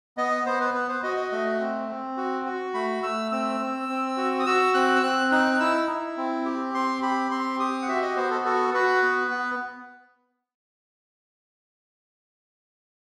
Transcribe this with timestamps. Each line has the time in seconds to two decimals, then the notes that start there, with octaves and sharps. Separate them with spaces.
0.17 B3 D#5
0.46 B3 C5
0.61 B4
0.74 B3 B4
0.89 C5
1.03 F#4 D#5
1.17 D#5
1.32 A3 D#5
1.60 C4
1.89 C4
2.17 F#4
2.46 F#4
2.74 A3 B5
3.02 A3 E6
3.32 C4 E6
3.60 C4
3.88 C4
4.17 F#4
4.40 D#6
4.46 F#4 E6
4.74 C4 F#6
4.96 E6
5.02 C4 F#6
5.31 D#4 F#6
5.54 F#6
5.60 E4 E6
5.89 E4
6.17 C4
6.45 G4
6.74 C4 C6
7.02 G4 B5
7.31 C4 C6
7.60 G4 D#6
7.82 F#5
7.88 F#4 E5
8.02 D#5
8.16 B3 C5
8.31 A4
8.45 F#4 A4
8.74 F#4 B4
9.02 B3
9.31 B3